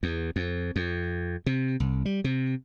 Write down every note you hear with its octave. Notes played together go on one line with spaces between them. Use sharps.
E2
F2
F2
C3
C2
G3
C3